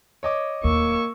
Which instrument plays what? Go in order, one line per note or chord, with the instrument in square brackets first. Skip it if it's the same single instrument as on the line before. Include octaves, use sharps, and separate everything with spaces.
[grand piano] C#5 D#5 D6
[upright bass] D1 D#2 [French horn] A#3 [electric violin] C#6 E6